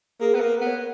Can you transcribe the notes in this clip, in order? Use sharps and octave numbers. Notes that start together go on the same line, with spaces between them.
A#3 G#4
B3 B4
A#3
B4
B3
C#5